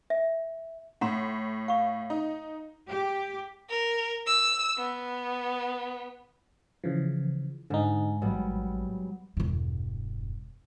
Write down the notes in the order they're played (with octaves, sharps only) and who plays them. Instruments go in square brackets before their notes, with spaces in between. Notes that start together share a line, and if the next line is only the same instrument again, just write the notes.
[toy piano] E5
[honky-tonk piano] A2 [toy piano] F#5 A#5 C6
[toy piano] F5 C#6
[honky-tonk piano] D#4
[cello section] G4
[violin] A#4
E6
B3
[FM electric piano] C#3 E3 F3
[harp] G#2 [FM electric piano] D3 D#4
[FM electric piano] A1 [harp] F#3 G3 B3
[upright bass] E1 G2